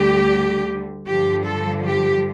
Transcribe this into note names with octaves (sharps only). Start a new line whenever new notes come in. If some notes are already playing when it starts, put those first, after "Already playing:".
Already playing: D2 D3 G3 G4
G2 D3 F3 G4
A4
G4